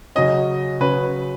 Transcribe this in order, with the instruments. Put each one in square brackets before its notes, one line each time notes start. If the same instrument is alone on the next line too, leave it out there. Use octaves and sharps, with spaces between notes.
[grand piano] C#3 F#3 C#4 F#4 C#5 [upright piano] D#5
[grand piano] C#3 F#3 C#4 F#4 C#5 [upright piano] B4